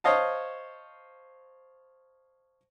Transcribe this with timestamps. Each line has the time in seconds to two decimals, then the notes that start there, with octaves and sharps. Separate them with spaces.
0.04 C5 C#5 D#5 F5 A5